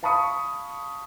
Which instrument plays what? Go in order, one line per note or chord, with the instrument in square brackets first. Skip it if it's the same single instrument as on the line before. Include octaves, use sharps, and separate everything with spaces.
[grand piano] F5 A5 B5 C#6 D#6 C#7